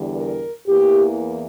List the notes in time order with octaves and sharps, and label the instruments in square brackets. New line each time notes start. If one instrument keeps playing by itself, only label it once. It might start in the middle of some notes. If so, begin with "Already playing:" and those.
Already playing: [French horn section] E2 D3 G3
A#4
E2 E3 A#3 G4